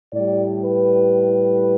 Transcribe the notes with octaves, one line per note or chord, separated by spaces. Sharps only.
A2 G3 D5
B4